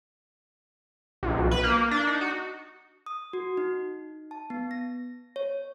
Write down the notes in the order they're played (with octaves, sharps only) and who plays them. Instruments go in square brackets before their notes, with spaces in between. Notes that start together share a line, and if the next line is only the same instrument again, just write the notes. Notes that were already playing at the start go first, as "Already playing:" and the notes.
[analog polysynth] A#1
B1
B4
A#3
A#3
D4
D#4
F#4
[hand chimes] D#6
F#4
D#4
A5
B3
A#6
C#5